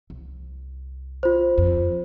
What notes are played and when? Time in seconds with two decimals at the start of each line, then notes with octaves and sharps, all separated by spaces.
0.10 C2
1.23 F4 C5
1.58 F2